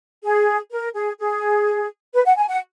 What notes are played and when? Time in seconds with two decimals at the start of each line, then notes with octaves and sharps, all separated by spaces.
0.24 G#4
0.72 A#4
0.94 G#4
1.19 G#4
2.13 B4
2.25 F#5
2.37 G#5
2.49 F#5